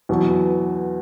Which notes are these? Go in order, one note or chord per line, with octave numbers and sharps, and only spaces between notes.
E2 B2 F#3